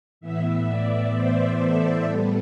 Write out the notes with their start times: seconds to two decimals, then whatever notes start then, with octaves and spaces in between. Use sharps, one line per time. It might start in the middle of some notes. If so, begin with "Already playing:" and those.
0.21 A2 E3 B3 E5
0.66 D5
1.12 C5
1.57 A4
2.03 A2 G3 B3 A4